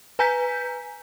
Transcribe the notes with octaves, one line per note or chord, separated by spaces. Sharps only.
B4 G#5 A#5 G6 B6